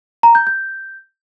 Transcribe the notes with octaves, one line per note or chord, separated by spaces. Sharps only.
A#5
G6
G6